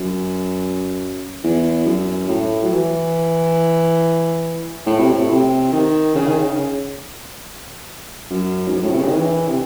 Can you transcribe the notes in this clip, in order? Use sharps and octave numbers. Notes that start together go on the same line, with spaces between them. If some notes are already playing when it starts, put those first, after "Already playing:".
Already playing: F#2
E2
F#2
A2
F#3
E3
A2
C3
A2
C3
D#3
C#3
D#3
C#3
F#2
G#2
F#2
A2
C3
C#3
D#3
E3
C3